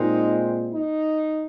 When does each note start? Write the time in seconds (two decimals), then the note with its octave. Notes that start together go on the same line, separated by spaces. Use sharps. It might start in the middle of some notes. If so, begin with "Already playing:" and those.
Already playing: A#2 G#3 C4 D#4
0.72 D#4